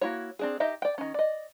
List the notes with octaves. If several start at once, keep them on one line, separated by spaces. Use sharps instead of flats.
A#3 E4 F#4 C#5
C4 D4 G#4
D#4 G4 D#5 E5
D5 G5
D#3 C#4
D5 D#5